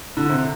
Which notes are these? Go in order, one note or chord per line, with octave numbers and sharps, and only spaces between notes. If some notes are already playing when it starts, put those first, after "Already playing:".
D3
C3